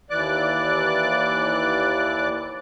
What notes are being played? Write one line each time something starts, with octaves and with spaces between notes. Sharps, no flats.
D#2 E3 D5 D6 F#6